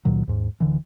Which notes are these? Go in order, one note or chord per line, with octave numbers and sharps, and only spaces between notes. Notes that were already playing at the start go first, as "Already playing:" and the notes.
C#2 A#2 D#3 F#3
D#2 G#2
D1 D3 E3